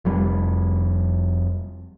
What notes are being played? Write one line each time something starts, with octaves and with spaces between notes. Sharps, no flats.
F1 F2 G3